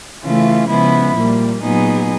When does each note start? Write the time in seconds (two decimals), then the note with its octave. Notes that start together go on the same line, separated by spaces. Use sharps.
0.24 C#3 E3 A3 C#4 F4
0.70 C#3 F3 G#3 B3 E4
1.16 A#2 G3 A#3
1.62 A#2 F#3 B3 D#4 G#4